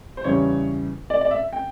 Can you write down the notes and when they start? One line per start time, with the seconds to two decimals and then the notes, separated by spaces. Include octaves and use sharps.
0.17 C5
0.24 E2 C#3 E3 G3 C#5
1.10 D5
1.21 D5
1.31 E5
1.53 G5